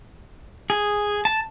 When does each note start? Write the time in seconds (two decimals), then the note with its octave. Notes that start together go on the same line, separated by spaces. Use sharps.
0.70 G#4
1.25 A5